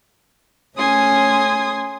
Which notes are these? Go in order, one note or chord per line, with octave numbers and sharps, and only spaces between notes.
A3 C#4 G#5 C6 D#6